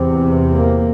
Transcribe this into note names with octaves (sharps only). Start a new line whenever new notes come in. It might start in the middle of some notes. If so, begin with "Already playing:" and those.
Already playing: E2 C3
A#3